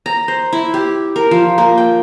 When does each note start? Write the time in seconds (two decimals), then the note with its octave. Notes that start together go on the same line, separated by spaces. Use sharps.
0.06 A#5
0.28 C5
0.52 E4
0.74 G4
1.16 A#4
1.31 F3
1.58 A#3
1.78 G5